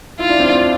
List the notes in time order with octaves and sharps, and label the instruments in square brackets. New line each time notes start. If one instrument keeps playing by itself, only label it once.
[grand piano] E4 [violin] F4
[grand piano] D4
C4
D4